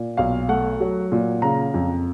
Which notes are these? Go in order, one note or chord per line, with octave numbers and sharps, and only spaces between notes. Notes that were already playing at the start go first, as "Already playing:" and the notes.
Already playing: A#2
B1 F5
A3 F#5
F#3
A#2
C#3 A#5
F2